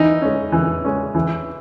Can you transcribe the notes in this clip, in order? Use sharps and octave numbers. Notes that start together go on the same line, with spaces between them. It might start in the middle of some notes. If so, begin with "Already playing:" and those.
Already playing: E3 D#4
G#3 C#4
E3
G#3 C#4
E3